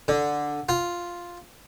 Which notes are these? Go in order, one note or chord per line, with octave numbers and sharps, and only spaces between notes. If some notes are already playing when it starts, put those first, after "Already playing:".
D3
F4